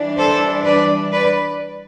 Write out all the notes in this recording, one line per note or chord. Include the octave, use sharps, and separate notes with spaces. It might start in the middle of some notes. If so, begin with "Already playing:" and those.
Already playing: E3 G3 D4
A4 C5
B4 D5
B4 D5